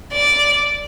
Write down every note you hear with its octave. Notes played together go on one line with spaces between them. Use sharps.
D5